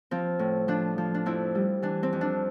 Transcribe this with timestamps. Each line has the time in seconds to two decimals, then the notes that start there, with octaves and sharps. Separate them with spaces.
0.11 F3 C4
0.39 A2
0.68 F3 D4
0.98 F3
1.14 D4
1.26 F2 C4 E4
1.55 G3
1.82 E3 D4
2.03 C4
2.13 F2
2.21 D4